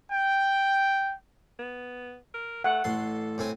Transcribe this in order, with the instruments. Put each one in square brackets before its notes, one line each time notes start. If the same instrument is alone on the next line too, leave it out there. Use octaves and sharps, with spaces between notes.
[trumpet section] G5
[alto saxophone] B3
A#4
[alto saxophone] A3 [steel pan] F#5
[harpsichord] A1 C6 [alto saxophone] A4
[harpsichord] A2 C4 G#5